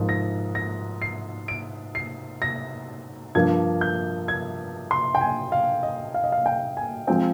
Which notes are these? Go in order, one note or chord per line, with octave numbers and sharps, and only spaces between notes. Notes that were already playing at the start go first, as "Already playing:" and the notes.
Already playing: G#2 F3 A#3
A#6
A#6
C7
D7
C7
A#6
G2 F3 A#3 G#6
G6
G#6
C6
G5
G#5
F5
D#5
F5
D#5
F5
G5
G#5
F3 G#3 C4 G5